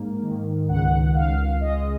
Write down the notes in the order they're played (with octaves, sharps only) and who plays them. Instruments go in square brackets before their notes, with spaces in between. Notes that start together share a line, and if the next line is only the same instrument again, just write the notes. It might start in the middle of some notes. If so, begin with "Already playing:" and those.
Already playing: [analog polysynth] G#2 A#3
D#3
C#2 F#5
C#2 F5
G#3 D#5